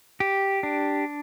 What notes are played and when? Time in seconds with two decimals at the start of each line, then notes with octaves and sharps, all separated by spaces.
0.20 G4
0.63 D4